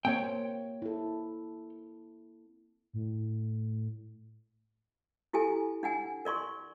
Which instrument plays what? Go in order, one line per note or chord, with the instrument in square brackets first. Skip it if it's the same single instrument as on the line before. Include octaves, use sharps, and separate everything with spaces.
[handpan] A#3 C4 [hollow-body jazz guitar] C#5 G5
[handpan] E4 A4
[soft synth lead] A2
[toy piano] E4 G4 A4 G#5
D4 F#5 G#5
A#4 D5 C6 C#6